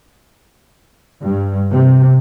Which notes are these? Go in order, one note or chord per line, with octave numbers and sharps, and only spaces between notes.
G2
C3